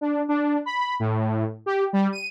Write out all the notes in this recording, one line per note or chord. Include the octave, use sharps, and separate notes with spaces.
D4
D4
B5
A2
G4
G3
D#7